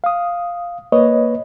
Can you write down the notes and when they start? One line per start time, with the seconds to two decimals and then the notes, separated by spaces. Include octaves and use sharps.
0.04 F5 D#6
0.92 A#3 B4 C#5 D#5